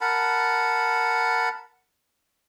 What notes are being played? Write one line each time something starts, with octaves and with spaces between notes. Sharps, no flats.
A#4 F#5 A5 B5